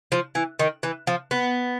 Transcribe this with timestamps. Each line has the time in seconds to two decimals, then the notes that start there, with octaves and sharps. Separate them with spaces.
0.12 F3
0.35 E3
0.59 D#3
0.83 E3
1.07 F3
1.31 B3